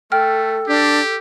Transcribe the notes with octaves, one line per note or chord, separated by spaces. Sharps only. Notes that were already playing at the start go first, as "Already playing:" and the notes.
A3 A4 G5 F6
D4 G4